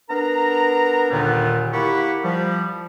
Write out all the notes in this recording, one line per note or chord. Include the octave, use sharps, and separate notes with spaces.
B3 D4 A#4 A#5
D#2 A#2 D3 D#3 G3 B3
A#3 E4 G4 F#5 B5 C#6
F3 G3